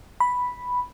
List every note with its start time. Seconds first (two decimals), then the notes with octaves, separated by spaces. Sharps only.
0.20 B5